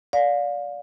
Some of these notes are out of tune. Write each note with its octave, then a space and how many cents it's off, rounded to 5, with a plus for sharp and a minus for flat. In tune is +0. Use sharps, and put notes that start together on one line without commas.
D5 -20 F5 +30